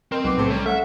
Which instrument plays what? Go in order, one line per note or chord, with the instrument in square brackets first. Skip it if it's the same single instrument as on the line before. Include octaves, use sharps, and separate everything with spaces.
[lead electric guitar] C4 [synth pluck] A#4 [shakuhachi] D#5
[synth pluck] B1 [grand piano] B3 [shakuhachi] D6
[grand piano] A2 A3 [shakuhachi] C5
[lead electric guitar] G3 [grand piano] C#4 [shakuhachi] A#4
[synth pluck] A4 [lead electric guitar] E5 [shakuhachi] F#5